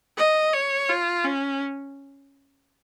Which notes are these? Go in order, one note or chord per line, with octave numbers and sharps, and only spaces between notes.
D#5
C#5
F4
C#4